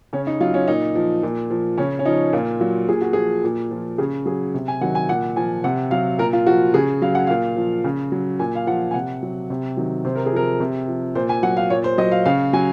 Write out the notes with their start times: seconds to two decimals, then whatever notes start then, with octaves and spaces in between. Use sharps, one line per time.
0.13 C#3 C#4
0.27 D#4
0.40 F#3 F4
0.54 C#4
0.68 A#2 D#4
0.95 F3
1.23 A#2
1.50 F3
1.78 C#3 C#4
1.99 C#4
2.05 F3 D#4
2.33 A#2 F4
2.61 F#3 F4
2.88 A#2 G#4
3.01 F#4
3.13 F3 G#4
3.44 A#2
3.71 F3
3.98 C#3 G#4
4.26 F#3 G#4
4.54 C3
4.68 G#5
4.81 D#3 F#3 F#5
4.95 G#5
5.09 A#2 F#5
5.36 F3 G#5
5.64 C3 F#5
5.91 F#3 F5
6.19 A#2 A#4
6.33 F4
6.46 F3 F#4
6.74 C#3 G#4
7.02 F#3 F5
7.15 F#5
7.27 A#2 F5
7.57 F3
7.84 C#3
8.12 F#3
8.39 A#2 G#5
8.55 F5
8.67 F3 F#5
8.91 G#5
8.94 C3 F#5
9.23 F#3
9.50 C3
9.77 D#3 F#3
10.05 C3 C5
10.15 A#4
10.26 G#4
10.32 F3 A#4
10.60 C3
10.88 F3
11.15 A#2 C5
11.29 G#5
11.43 F#3 F#5
11.57 F5
11.70 A#2 C#5
11.84 C5
11.98 F#3 D#5
12.11 F5
12.26 C#3 F5
12.53 F#3 G#5